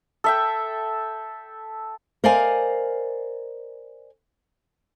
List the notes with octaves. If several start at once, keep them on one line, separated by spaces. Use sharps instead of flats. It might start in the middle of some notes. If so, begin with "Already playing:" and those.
A4 E5 G5
A#4 C5 D5 D#5 F5 G#5